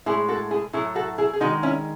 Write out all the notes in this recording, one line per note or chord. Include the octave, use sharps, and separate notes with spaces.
A2 G#3 E4 G#4
F#4 A4
E4 G#4
A2 F#3 A3 E4 G#4
F#4 A4
E4 G#4
G#4
D#3 G#3 D#4 F#4
C#4 E4